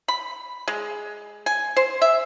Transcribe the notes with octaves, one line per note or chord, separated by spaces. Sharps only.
B5
G#3
G#5
C5
E5